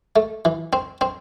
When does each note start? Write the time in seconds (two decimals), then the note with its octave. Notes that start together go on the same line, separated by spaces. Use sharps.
0.16 A3
0.45 E3
0.73 C4
1.01 C4